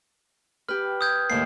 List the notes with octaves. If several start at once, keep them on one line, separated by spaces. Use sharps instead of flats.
G4 B4 F6
D#6 G6 G#6
D#2 A2 D#3 C7